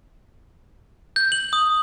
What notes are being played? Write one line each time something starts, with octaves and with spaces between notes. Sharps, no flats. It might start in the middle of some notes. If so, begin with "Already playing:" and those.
G6
F#7
D#6